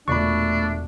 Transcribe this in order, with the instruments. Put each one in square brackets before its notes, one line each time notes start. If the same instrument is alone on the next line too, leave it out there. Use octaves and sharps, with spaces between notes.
[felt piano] E1 A#2 D5 [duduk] A3 [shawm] D4 [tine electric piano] B5 C#6